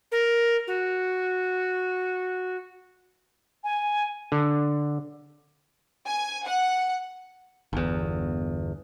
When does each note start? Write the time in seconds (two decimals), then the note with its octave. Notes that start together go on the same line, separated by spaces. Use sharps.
0.12 A#4
0.67 F#4
3.64 G#5
4.32 D3
6.06 G#5
6.44 F#5
7.73 G1 E2